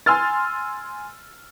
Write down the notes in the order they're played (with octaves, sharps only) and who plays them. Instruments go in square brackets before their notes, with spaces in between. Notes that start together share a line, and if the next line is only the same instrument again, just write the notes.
[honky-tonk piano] G#5 C6 E6 F6 A6